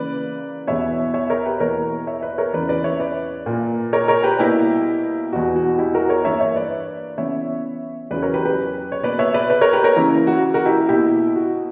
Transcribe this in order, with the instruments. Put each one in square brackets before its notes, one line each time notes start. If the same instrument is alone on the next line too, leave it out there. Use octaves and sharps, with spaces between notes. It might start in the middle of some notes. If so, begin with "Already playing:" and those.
Already playing: [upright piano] C#3 E3 A#3 B4 D5
E2 B2 G3 B3 C#5 E5
C#5 E5
A#4 C#5
G4 B4
E2 B2 A#3 A#4 C#5
C#5 E5
B4 D5
A#4 C#5
E2 C#3 E3 B4 D5
B4 D5
C#5 E5
B4 D5
A#2 A#3
A#4 C#5
A#4 C#5
G4 B4
B2 G3 A#3 E4 G4
E2 B2 G3 F#4
F#4
E4 G4
F#4 A#4
A#4 C#5
G2 E3 A#3 C#5 E5
C#5 E5
B4 D5
C#3 E3 B3 C#5 E5
E2 C#3 F#3 B4 D5
A#4 C#5
G4 B4
G4 B4
C#5
B2 A#3 B4 D5
C#5 E5
B4 D5
B4 D5
A#4 C#5
G4 B4
A#4 C#5
C#3 E3 A#3 E4
F#4
F#4 A#4
E4 G4
B2 A#3 E4 G4
F#4